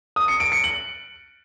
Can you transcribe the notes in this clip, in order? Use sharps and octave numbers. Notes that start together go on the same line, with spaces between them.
D#6
C#7
D7
C#7
F#7